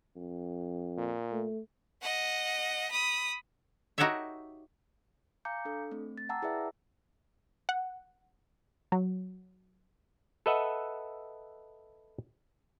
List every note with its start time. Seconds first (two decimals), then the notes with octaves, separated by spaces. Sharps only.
0.16 F2
0.97 A#2
1.32 A3
2.02 D#5 F#5
2.91 B5 D#6
3.98 D#4 F#4 G4 A4 C#5 E5
5.45 F5 G#5 A#5 D6 G6 C#7
5.65 D4 A4
5.91 A3 C4
6.18 A6
6.29 F#5 G5 A5 A#5 D6 E6
6.42 E4 G#4 B4 D5 E5
7.69 F#5
8.92 F#3
10.46 A4 B4 D#5 E5 F#5